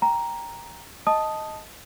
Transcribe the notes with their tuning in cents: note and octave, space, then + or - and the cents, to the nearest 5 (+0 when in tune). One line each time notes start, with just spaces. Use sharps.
G5 +0 A#5 +5
D#5 +10 A5 +0 D#6 +0